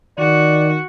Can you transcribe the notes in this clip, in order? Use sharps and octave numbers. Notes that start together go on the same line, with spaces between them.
D#3 F#4 D5